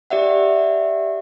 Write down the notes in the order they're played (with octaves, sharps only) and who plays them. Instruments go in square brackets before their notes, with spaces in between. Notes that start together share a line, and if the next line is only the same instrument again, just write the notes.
[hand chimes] G4 D5 E5 F#5